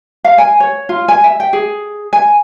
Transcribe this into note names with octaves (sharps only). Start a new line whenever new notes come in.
F5
G#5
C#5
F4
G#5
E5
G5
G#4
G#5